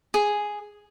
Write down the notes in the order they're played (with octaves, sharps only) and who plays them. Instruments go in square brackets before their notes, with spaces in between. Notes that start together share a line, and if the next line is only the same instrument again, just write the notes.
[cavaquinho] G#4